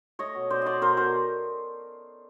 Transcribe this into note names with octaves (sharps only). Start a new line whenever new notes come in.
A3 C#5 D#5
B2
B2 C5 D5
A3 C5 D5 D#5
B2 A#4 C5
B2 A#4 C5